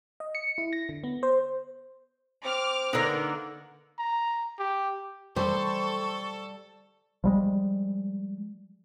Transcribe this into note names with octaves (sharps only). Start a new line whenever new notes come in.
D#5
C#7
E4
A#6
D3
B3
C5
C4 D6 F6
D3 A#3 B3 D#4 A#4
A#5
G4
G3 A4 C5 C#6
F3 G3 G#3